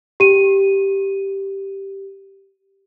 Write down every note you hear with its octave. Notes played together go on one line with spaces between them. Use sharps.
G4 D#7